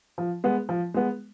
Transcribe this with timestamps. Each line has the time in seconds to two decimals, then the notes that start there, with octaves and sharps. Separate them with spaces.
0.18 F3
0.44 G#3 B3
0.69 F3
0.94 G#3 B3